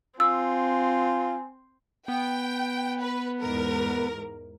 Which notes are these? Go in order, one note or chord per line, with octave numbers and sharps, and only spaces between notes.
C4 F4 G#5 E6
B3 G5
B4
E2 G#2 A#4